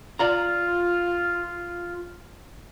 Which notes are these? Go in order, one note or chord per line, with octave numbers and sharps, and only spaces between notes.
F4 D5 F5 A#5